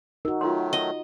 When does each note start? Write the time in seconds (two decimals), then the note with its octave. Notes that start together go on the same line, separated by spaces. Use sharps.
0.25 D#4 F#4 A#4
0.41 D#3 F#3 A3 F4 C6
0.73 D#5